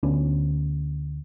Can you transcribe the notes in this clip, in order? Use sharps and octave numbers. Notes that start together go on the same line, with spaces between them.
D2 B3 C#4 D4